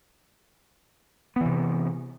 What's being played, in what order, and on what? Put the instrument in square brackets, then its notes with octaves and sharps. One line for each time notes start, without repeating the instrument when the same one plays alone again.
[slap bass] B3
E3
C3